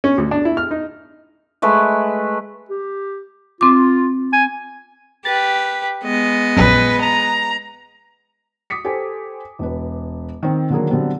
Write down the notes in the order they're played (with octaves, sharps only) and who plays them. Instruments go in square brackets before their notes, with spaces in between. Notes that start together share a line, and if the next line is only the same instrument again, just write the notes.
[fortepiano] C#4
D2
D4
E4
F6
D#4
[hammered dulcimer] G#3 A3 B4
[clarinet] G4
[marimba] C4 D6 [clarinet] F4
[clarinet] G#5
[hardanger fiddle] G4 B4 [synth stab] A6
[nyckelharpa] G#3 D#5 [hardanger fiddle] B3
[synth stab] A#1 F#2 [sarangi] B4
[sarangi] A#5
[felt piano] D6 D#6 B6 C#7
G4 A4 C5 G#5
E1 B4
D#3 C4
D3 D#3 F#3 A#3 G#4 A#4
D3 F#3 G3 B3 C4